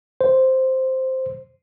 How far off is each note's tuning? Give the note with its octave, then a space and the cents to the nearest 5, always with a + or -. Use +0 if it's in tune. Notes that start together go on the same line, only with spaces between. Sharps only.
C5 +0